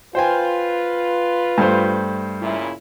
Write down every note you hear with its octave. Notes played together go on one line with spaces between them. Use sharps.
F4 B4 C5 G5 G#5
G2 A3 C5
A#2 C#3 E4